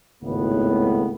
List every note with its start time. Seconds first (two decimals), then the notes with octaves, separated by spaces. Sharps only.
0.23 G#1 C#2 A2 B3